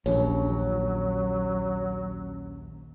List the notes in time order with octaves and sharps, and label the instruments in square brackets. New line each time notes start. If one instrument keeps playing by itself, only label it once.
[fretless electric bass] A#1 [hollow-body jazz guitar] D#2 [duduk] F#3 [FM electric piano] C#4